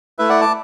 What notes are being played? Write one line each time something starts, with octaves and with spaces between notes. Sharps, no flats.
A3 E4 B4 E5
D5 F#5
A5 D6